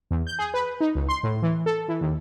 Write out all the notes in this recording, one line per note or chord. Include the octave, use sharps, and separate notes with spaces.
E2
G6
G#4
B4
D#4
C#2
C6
A2
E3
A4
E3
D#2